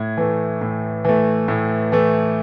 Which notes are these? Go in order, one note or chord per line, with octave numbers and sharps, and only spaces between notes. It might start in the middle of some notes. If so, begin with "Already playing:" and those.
Already playing: A2 G#6
E3 A3
A2
E3 A3
A2
E3 A3